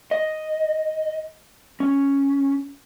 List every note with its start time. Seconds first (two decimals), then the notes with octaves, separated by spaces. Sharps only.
0.11 D#5
1.80 C#4